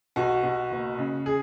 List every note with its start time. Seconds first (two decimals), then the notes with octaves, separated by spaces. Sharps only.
0.16 B1 F#4
0.43 B1
0.71 F#1
0.98 C#3
1.26 G#4